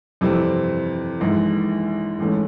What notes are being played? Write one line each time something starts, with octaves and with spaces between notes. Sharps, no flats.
F2 C3 E3 G3 C4
A#1 G#2 E3
A1 G#2 E3 A3 C#4